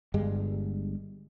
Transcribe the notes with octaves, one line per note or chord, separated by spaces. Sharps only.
G1 G2 G3 G#3